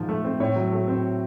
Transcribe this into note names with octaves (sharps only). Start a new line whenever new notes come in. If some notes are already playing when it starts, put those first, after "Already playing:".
Already playing: G#2 F3
A3
C4
A2 C#5
F#3
A3
C4